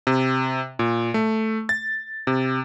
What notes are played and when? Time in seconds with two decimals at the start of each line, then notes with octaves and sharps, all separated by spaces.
0.07 C3
0.79 A#2
1.14 A3
1.69 A6
2.27 C3